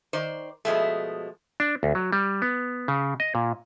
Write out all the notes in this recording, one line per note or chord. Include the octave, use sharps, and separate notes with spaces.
D#3 C5 D5
B2 F3 G#3 A3
D4
D2
F#3
G3
B3
C#3
D#5
A#2